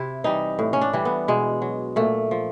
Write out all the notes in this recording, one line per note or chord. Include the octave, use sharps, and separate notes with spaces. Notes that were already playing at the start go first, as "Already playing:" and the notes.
Already playing: C3 E4
E3 G3 D#4
A2
C#4
D4
E3 G3
B3
B2 G#3
F#3
A#2 A3
F3